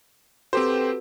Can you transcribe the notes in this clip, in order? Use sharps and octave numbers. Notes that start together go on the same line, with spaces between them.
C4 F#4 G4 A4 B4 C5